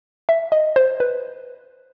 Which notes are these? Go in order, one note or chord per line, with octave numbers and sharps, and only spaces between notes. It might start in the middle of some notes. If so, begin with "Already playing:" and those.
E5
D#5
C5
B4